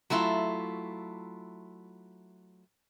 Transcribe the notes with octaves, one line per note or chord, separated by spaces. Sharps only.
F#3 A3 E4 F4